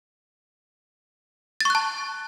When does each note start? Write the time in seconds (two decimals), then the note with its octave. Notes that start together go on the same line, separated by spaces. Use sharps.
1.61 A6
1.65 C#6
1.70 F#6
1.75 A5